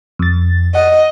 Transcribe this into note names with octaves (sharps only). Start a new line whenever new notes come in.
F2 A6
D#5 F#5